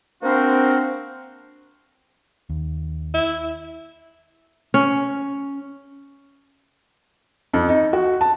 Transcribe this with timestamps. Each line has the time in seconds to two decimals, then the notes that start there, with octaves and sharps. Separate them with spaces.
0.23 A#3 C4 D4 F#4 A#4 C5
2.50 D#2
3.14 E4
4.74 C#4
7.53 F2
7.69 D#4
7.93 F#4
8.21 A5